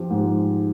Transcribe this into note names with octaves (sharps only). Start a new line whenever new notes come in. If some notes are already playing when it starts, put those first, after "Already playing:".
Already playing: F3 G4
G#2